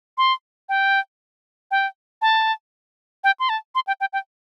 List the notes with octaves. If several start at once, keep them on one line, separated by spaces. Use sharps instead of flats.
C6
G5
G5
A5
G5
C6
A5
C6
G5
G5
G5